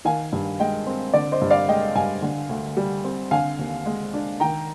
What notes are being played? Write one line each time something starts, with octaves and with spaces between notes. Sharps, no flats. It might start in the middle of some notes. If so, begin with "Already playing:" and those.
D#3 F5 G#5
G2
G#3 D#5 G5
C4
D3 D5
C5 D#5
G2
D5 F5
G#3 D#5 G5
G2 F5 G#5
D3
D2
G3
C4
D3 F5 G#5
D#2
G#3
D4
D#3 G5 A#5